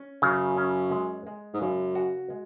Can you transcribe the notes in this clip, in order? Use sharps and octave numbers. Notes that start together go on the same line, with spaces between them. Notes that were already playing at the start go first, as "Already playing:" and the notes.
Already playing: C#4
F#2 C#3
C#4
G#3
G#3
G#2
F#2 C#3
F#4
G#3